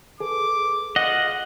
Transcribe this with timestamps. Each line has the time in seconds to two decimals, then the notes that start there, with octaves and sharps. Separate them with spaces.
0.20 G#4 A4 B4 D6
0.96 F4 D#5 F#5